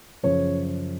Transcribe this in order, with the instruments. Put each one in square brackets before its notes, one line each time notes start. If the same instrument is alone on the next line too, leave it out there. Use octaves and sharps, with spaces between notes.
[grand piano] F#2 C#3 F3 C#5